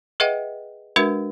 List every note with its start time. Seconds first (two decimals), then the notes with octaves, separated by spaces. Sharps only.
0.20 G#4 B4 D#5 E5 F#5 G5
0.96 G#3 D4 F#4 A#4 B4 E5